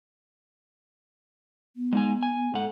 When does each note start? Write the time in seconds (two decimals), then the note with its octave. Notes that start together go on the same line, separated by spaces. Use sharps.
1.76 B3
1.93 G#3 D#4 G#5
2.23 G#5
2.54 G#2 A4 F#5